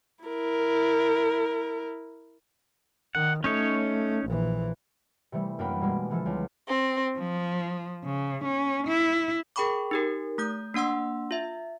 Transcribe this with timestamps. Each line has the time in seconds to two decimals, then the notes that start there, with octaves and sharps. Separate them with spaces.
0.24 E4 A#4
3.15 D#3 F#5
3.44 A3 C#4 D#4 C#5
4.25 A#1 E3
5.32 C3 E3 G3 A3
5.59 F#2 A#3 D4 F5 G5 B5
5.81 B2 G3 G#3 A#3
6.10 D3 E3 F3 A4
6.26 C#2
6.67 C4
7.18 F3
8.05 C#3
8.44 C#4
8.87 E4
9.56 G#4 A#4 G5 B5 C#6 D6
9.91 D#4 G4 A#4
10.38 A3 D#6 G6
10.74 A#3 D4 F#5 C6 E6
11.31 F4 E5